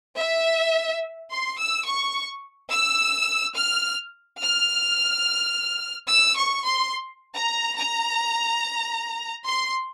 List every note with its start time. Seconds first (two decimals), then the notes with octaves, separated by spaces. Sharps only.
0.16 E5
1.29 C6
1.58 E6
1.86 C#6
2.70 E6
3.55 F6
4.40 F6
6.08 E6
6.36 C#6
6.65 C6
7.35 A#5
7.78 A#5
9.46 C6